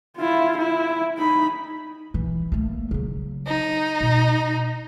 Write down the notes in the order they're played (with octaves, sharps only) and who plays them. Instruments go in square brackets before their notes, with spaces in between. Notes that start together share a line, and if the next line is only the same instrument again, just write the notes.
[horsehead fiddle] E4 F4
E4
D#4 B5
[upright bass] E3
A3 A#3
C#3 F#3
[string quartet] D#4
[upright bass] B2